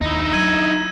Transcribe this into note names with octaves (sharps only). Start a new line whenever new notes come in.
D#2 D#4 E4
F#3 E6 G#6 D#7